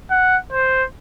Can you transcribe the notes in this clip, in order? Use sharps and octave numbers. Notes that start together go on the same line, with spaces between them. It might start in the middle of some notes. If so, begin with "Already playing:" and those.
F#5
C5